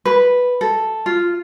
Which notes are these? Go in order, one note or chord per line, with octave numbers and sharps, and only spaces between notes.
B4
A4
F4